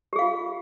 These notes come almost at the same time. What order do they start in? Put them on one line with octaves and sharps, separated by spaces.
G4 G#4 F5 F4